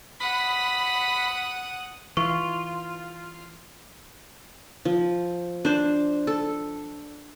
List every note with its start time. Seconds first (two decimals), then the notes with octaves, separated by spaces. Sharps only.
0.20 F#5 B5 D#6
2.17 E3 F4 C#6
4.85 F3
5.65 D4 C5
6.27 A4